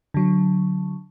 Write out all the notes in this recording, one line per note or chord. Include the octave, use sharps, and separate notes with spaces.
D3 F#3